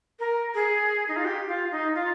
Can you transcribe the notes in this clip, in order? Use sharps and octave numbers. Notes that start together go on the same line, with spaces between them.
A#4
G#4
D#4
F4
G4
F4
D#4
F4